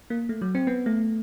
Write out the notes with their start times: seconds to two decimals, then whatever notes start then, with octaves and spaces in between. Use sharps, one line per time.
0.10 A#3
0.29 A3
0.42 F#3
0.55 C4
0.67 B3
0.86 A3